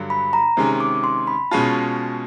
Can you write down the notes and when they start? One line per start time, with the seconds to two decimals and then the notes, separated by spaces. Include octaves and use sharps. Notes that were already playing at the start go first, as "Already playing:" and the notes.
Already playing: G2 D3 F#3
0.10 B5
0.33 A#5
0.57 C3 D#3 G#3 C#4
0.80 D6
1.04 C6
1.27 B5
1.51 B2 G#3 C#4 F4 A5